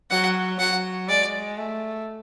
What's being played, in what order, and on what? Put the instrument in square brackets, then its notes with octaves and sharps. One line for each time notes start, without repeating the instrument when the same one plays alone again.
[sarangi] F#3 [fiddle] F#5
[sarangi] F#3 [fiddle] F#5
[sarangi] G#3 [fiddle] D5
[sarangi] A3